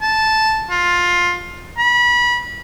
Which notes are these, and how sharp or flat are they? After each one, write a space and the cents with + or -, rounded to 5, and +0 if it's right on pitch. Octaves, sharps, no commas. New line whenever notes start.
A5 -5
F4 +15
B5 -30